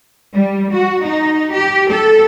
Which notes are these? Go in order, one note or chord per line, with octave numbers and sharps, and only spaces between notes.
G3
F#4
D#4
G4
A4